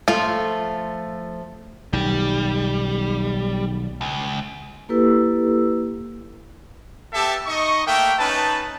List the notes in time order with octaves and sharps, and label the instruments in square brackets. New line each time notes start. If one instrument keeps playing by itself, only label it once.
[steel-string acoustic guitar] F3 A3 [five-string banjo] F4
[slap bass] B1 D#3 [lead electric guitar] G3
[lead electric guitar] C#2
[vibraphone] A#3 E4 G4 A4 B4 E6
[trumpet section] B3 G4 A4 E5 A5
D#4 D#5 C#6
A3 A#3 E5 G5
C#4 D#4 B4 A5